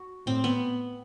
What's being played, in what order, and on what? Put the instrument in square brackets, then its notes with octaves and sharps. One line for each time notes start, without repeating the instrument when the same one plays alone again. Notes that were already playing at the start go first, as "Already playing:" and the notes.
Already playing: [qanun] F#4
[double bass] A2 [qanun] C4
[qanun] B3